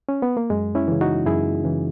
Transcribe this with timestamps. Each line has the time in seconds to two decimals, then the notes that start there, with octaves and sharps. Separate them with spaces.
0.09 C#4
0.22 B3
0.37 A#3
0.50 F#2 G#3
0.75 C#4 E4
0.88 C#3 E3
1.01 D#4 F#4
1.26 F#2 E4 G#4
1.64 C#3 E3